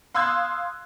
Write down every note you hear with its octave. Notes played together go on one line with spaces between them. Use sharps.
F5 C6 D#6 E6 F#6 G#6